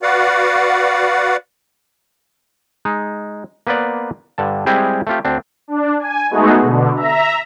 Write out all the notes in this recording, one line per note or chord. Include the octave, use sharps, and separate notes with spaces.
F#4 B4 D5 F5 F#5
G#3 D#4
A#3 B3 B4 C5 D5
G2 D3 A5
G3 G#3 C4 E4 G4 G#4
A3 C4 F4 G4
D2 C4 D4
D4
G#5
G#3 A3 B3 D#4 F#4 G#4
B2 D3
E5 A#5